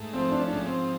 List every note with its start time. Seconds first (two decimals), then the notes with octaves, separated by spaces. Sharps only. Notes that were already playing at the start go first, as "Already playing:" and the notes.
Already playing: G#2 A3
0.13 F3 C4
0.31 D4
0.39 C#4
0.48 D4
0.52 G#2 C#4
0.66 C4